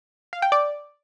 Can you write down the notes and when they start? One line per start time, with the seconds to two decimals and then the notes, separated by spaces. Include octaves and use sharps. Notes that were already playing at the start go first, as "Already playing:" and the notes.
0.33 F5
0.42 G5
0.52 D5